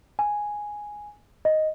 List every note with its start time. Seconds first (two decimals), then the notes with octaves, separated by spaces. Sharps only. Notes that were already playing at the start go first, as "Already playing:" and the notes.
0.19 G#5
1.45 D#5